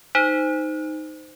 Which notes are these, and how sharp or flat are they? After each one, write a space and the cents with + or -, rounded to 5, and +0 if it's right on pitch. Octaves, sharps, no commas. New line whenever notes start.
D#4 +0 C5 -15